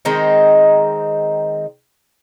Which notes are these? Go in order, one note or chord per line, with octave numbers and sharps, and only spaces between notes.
D#3 G#3 C4 D#4